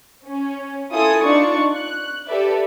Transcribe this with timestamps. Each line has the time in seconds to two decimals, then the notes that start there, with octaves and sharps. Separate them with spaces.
0.27 C#4
0.93 E4 F4 A4 G#5 D#6
1.24 D4 D#4 F4 D5 C#6
1.75 F#6
2.28 G4 A4 B4 D5 E5